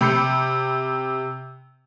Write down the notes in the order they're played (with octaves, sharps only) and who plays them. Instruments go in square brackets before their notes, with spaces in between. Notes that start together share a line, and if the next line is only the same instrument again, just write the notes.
[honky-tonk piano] C3 G4 B5 G6 C#7